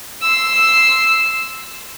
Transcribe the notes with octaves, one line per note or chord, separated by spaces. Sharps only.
C6 E6